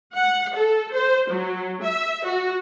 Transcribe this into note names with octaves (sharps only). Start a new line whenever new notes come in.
F#5
A4
C5
F#3
E5
F#4